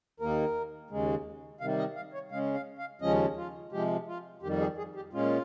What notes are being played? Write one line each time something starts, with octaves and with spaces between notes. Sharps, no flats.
D#2 D#3 A#3 D#4 A#4
D#2 C#3 G#3
C3 D#3 G3 F5
D#5
F5
C#5
C#3 G#3 C#4 F5
F5
F5
D#2 C#3 F3 G#3 C#4 D#5
F4
C3 F3 G#3 G4
F4
F2 D#3 G3 G4
G#4
G#4
G4
A#2 G#3 C#4 F4